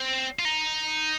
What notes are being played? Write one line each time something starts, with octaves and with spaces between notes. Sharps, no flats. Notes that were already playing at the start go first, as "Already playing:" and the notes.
Already playing: C4
F4
D#4